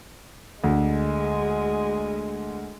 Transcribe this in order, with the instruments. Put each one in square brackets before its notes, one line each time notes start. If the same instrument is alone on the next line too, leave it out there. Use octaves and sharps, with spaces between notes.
[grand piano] D2 [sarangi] G#3